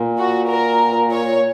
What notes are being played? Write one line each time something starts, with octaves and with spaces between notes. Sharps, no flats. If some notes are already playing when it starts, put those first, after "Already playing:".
Already playing: A#2
F#4
A#4
C#5